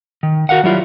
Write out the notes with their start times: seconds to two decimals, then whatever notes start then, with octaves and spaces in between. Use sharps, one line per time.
0.23 D#3
0.49 F#4 A#4 F5 F#5
0.64 F#3 G3 E4 F4